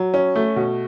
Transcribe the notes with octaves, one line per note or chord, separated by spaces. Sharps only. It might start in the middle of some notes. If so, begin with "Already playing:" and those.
Already playing: F#3
C#4
A3
B2